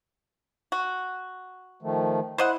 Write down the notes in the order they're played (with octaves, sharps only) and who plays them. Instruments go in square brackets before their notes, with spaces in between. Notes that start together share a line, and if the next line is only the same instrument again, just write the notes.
[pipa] F#4
[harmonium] D#3 F3 A3
[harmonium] E4 [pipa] C5 D#5 F#5